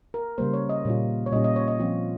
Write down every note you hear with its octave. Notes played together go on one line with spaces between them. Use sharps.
A#4
C#3 G3 A#3 C5
C#5
D#5
A#2 G3 C#4 F4
C#5
A#2 G3 C#4 F4 D#5
D#5
C#5
D#5
F3 C4 F4